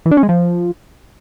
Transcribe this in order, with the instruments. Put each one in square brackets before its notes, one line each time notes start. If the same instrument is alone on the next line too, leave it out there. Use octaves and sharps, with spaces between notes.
[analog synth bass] E3
D4
C#4
G#3
F3